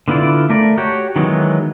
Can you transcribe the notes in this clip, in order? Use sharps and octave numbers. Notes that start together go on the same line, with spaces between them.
D3 B3 E4 F4 D5
A3 A#4 D5
F#4 G4 C#5
D#3 E3 F#3 G#3 B3